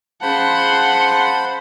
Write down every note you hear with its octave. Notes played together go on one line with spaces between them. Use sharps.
C#4 G#4 C5 F5 F#5 A5 B5 C6